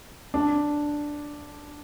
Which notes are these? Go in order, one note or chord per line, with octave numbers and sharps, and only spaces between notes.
D4